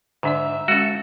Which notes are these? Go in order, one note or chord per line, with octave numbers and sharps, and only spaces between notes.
G#2 D3 D4 D5 E5
G#3 C#4 F#4 A4